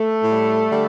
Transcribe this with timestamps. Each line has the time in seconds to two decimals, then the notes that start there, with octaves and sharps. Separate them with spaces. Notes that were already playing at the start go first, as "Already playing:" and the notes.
Already playing: A3
0.24 A2 G3
0.69 D3 G3